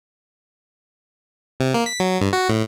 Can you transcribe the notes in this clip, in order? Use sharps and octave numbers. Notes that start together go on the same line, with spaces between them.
C3
A#3
B6
F#3
G2
F#4
A2